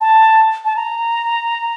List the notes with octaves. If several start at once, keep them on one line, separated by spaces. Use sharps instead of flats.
A5
A5
A#5